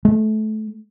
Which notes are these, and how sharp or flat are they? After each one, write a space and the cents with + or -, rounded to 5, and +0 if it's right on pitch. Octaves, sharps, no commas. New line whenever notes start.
A3 -25